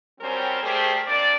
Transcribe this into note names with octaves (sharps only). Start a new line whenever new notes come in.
F#3 G3 C4 C#4 A#4 C5
G3 A3 G4 G#4 A#4 C5
C3 A#3 D4 D5